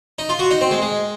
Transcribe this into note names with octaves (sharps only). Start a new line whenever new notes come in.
D#4
F4
F#4
D#4
C4
G#3
G#3